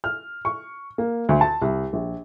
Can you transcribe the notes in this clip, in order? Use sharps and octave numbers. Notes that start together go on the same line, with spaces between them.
F6
C#6
A#3
D2
A5
C2
A#1